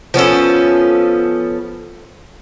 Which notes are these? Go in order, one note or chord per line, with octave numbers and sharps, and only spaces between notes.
F3 B3 C#4 A4